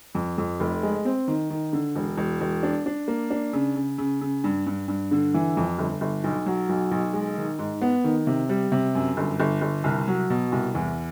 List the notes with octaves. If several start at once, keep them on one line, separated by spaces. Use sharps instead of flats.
F2
F2
F1
G#3
C4
D#3
D#3
D3
E1
E1
E1
D4
D4
A#3
D4
C#3
C#3
C#3
C#3
G2
G2
G2
D3
E3
F2
G1
G1
B1
F#3
B1
B1
G#3
D#3
G#2
B3
D#3
C3
G3
C3
F#2
G1
G1
G1
C2
F#3
B2
C2
E2